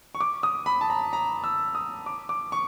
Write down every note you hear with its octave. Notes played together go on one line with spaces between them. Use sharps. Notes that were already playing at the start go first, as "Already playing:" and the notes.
C#6
D6
D#6
B5
A5
A#5
A#5
E6
D#6
D6
D6
C#6